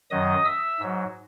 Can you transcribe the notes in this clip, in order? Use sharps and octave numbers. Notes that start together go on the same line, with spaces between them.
F#2 D#3 F#3 D#5 D#6
E5 E6
G#2 F#3